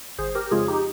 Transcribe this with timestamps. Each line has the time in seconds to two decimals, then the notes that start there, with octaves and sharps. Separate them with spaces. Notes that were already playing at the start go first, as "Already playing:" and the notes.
0.18 G1 G#4 C5
0.35 G4 A#4
0.51 F2 C#3 F3 G#3 F4 G#4
0.68 D#4 G4